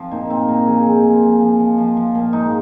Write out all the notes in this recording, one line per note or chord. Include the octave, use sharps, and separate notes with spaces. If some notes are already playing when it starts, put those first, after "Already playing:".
Already playing: F3 C4
A#2 D#4
A#2 C4
A#2 A#4
F3 G#4
F3
A#2
F3
F3
F3
F3
F3
A#2
G#2 D#4